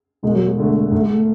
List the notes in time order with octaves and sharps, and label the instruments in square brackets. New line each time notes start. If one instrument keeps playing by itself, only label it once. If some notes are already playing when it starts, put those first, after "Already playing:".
[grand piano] E1 [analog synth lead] G#3
[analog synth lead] F#3
G#3
[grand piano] D2 D3 A3
[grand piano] G#2 [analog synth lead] A3
[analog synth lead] G#3
A3